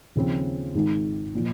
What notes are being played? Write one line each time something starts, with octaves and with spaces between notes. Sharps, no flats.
D#2 C#3 F3 C4
G#1 G#2 D#3 G#3
A#2 F3